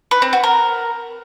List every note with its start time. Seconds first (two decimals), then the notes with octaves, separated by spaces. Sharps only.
0.11 B4
0.22 C4
0.33 F#4
0.43 A#4